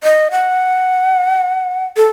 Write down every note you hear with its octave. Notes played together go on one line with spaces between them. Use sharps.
D#5
F#5
A4